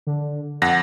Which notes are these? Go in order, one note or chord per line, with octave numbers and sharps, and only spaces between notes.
D3
F2 F#5 A#6